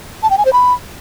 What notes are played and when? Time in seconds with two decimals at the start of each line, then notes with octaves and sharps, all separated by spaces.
0.23 A5
0.30 G5
0.38 G#5
0.45 C5
0.53 B5